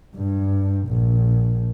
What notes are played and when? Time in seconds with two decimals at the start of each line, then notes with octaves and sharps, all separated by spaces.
0.16 G2
0.88 A#1